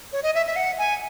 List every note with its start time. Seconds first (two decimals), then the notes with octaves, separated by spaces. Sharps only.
0.13 C#5
0.23 D#5
0.35 E5
0.46 E5
0.56 F#5
0.78 G#5